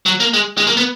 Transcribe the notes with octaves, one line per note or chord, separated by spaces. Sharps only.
F#3
A#3
G#3
G#3
A#3
B3